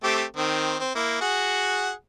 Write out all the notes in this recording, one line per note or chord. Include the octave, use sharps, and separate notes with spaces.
A3 C4 G4
D#3 C4
C4
A#3 E4
F#4 G#4 F#5